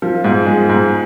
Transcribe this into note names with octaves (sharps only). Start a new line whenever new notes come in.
F3
G#2
G#3
G#2